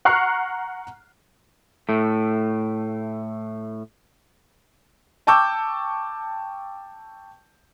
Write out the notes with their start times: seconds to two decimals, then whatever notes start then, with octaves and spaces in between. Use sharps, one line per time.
0.05 F#5 A#5 C#6 F6 F#6 C7
1.89 A2 A3
5.27 G5 A5 C#6 D6 E6 G6